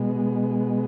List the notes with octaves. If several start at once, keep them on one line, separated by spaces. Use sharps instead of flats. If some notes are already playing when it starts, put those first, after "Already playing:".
Already playing: B2 G#3